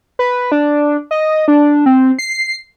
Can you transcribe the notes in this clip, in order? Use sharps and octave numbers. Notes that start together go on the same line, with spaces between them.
B4
D4
D#5
D4
C4
C7